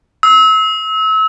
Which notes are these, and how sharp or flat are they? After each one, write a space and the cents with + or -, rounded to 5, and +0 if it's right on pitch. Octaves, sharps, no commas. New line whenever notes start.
E6 -30